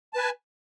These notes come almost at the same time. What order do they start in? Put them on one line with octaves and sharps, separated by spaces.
A5 B4 G#5